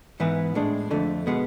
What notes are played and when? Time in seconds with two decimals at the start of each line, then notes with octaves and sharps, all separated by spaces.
0.20 G#2 E3 B3 E4 B4
0.55 A2 G#3 D4
0.91 F2 D3 A3
1.27 B2 G#3 B3